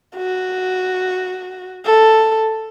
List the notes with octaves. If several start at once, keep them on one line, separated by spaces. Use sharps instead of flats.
F#4
A4